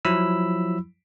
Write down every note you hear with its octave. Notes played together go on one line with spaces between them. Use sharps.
F3 F#3 E4 B5 E6